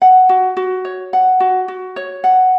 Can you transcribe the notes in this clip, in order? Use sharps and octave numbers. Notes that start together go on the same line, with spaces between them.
F#5
F#4
F#4
C#5
F#5
F#4
F#4
C#5
F#5